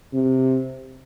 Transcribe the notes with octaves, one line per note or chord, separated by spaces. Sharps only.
C3